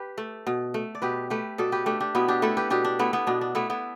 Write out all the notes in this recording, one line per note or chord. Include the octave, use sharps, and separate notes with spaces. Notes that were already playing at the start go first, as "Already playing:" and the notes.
Already playing: G4 B4
A3
B2
A3
D5
B2 G4 B4
A3 G4 B4
B2 A4 D5
G4 B4
A3 D4 G4
D4 G4
B2 B3 E4
D4 G4
A3 E4 A4
G4 B4
B2 D4 G4
D4
A3 B3 E4
B3 E4
B2 D4
D4
A3 B3 E4
B3 E4